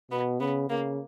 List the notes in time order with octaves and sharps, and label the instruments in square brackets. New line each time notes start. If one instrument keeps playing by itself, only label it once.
[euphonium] B2 [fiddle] B3
[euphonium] C#3 [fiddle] B3
[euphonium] C#3 [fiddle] A#3